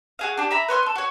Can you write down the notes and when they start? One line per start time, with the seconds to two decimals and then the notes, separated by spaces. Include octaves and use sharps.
0.19 F#4 G#4 F5
0.37 D4 G4
0.51 E5 A#5 B5
0.68 B4 C#5 C6 F6
0.83 A4 C6
0.96 F#4 C#5